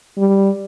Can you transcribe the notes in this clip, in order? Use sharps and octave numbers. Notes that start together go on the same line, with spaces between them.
G3